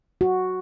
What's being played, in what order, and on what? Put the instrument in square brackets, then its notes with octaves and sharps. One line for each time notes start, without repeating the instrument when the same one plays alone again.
[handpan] F#4